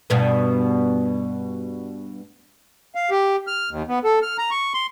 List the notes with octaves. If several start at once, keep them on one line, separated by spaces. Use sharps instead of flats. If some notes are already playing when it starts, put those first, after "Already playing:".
G2 B2 B3
F5
G4
F6
D#2
B3
A4
F6
A#5
C#6
C6